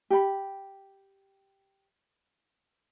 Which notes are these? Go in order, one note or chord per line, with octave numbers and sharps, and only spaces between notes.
G4 B5